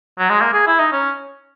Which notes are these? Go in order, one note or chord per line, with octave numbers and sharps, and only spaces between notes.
F#3
G#3
A#3
G#4
E4
D#4
C#4